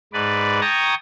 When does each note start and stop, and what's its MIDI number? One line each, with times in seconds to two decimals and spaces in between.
0.13 0.60 44
0.13 0.60 71
0.13 0.60 74
0.61 0.94 79
0.61 0.94 81
0.61 0.94 82
0.61 0.94 85
0.61 0.94 87
0.61 0.94 92